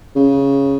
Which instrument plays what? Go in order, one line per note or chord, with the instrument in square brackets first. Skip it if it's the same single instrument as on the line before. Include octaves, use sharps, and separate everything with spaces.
[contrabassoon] C#3